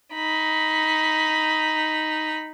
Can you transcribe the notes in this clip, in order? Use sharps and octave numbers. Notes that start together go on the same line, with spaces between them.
D#4 B5